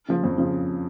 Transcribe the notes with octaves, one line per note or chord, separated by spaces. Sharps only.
C#3 F3
F2
C#3 F3